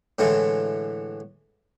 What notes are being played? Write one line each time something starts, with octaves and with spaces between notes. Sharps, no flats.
A2 D3 E3 G#3 A3